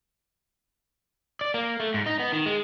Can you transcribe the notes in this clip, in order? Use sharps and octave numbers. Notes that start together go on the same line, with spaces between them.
D5
A#3
A3
G#2
D#4
B3
D#3
G#3